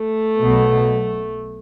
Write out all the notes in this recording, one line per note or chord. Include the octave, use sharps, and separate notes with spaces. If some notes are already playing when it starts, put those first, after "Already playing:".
Already playing: A3
B1 B2